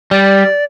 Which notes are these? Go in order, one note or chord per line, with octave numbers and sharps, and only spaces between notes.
G3 D5